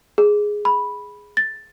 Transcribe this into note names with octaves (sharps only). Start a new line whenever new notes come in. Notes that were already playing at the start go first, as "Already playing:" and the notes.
G#4
B5
A6